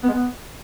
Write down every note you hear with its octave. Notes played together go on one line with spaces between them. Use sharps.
B3
G#3
B3